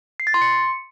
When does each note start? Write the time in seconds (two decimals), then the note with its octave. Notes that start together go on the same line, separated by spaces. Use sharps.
0.20 C7
0.27 A6
0.34 C6
0.41 C#7